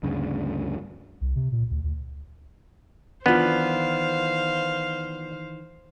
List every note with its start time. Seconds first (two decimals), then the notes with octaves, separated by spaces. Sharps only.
0.03 D2 G2 C#3
1.21 C2
1.36 C3
1.52 A#2
1.71 D2
1.84 D2
3.26 D#3 E3 B3 D4 F4 C5 F5